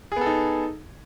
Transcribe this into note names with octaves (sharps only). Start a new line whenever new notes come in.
B3 D#4 G#4 A4